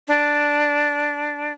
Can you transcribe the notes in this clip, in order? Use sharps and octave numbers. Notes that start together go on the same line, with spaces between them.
D4